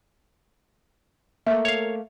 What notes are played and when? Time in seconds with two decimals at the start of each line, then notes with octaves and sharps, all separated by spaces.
1.47 A3 A#3 E5
1.65 C#5 F5